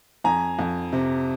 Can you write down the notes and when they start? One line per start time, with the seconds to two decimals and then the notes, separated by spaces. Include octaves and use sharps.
0.24 F2 G#5 A#5
0.59 F2
0.92 C3